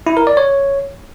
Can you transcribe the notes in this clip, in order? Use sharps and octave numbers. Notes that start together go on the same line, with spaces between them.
E4
A#4
D5
C#5